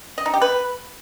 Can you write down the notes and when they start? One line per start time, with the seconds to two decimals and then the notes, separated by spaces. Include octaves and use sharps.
0.18 D#5
0.26 D#4
0.34 G4
0.42 B4